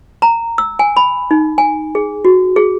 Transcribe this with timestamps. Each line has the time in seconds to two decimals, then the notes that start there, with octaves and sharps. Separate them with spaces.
0.22 A#5
0.58 E6
0.79 G#5
0.97 B5
1.31 D#4
1.58 G#5
1.95 G#4
2.25 F#4
2.56 G#4